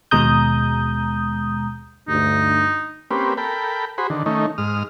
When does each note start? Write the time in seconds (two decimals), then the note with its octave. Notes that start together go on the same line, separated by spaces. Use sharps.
0.11 D#2 B2 G#3 A#5 D#6 G6
2.09 D2 G2 D#4
3.11 A#3 C4 C#4 G4 B4
3.37 A4 A#4 G5 B5
3.98 F#4 G#4 C5 B5
4.10 D3 D#3
4.26 D#3 A3 C#4 D#4
4.58 G#2 D#6 F6